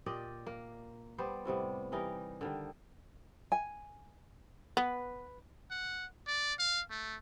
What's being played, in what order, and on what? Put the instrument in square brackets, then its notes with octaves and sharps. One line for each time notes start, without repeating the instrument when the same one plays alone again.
[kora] A#2 G4 D5 D#5
A#3
G3 B3 C5 D5
A2 C3 G3 B3
E3 G3 D#4 A#4
D3 D#3 G3
[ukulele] G#5
[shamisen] B3 [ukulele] B4
[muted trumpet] F#5
D5
F5
A3